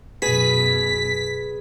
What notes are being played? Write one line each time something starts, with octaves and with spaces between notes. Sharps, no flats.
F#2 B2 G#4 B4 B6